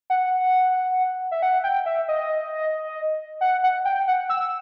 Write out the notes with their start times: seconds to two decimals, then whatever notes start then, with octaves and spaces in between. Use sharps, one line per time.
0.10 F#5
1.31 E5
1.42 F#5
1.64 G5
1.86 E5
2.08 D#5
3.41 F#5
3.63 F#5
3.85 G5
4.08 F#5
4.30 E6